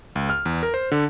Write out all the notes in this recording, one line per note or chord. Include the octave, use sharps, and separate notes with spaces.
C#2
F6
E2
A#4
C5
D3